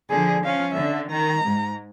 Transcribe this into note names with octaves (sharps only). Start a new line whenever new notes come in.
D3 F3 G#4
F3 C#4 F5
D3 E5
D#3 A#5
G#2